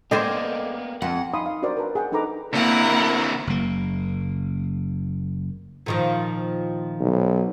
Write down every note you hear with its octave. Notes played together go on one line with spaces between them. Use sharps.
A#3 B3 G#4 A4 C5 D5 D#5 G5
F2 F#5
D#4 F5 G#5 B5 C6 D#6
F5
D4 F#4 A#4 C5 D5
A#4 B4 A5
G#4 F#5 G5
D4 D#4 A4 B4 A#5 D6
D3 A#3 C4 E4 A#4 F#5
F#1 A#3
A#2 D#3 F3
B1